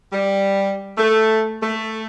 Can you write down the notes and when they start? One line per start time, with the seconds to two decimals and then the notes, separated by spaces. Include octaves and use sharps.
0.12 G3
0.98 A3
1.63 A3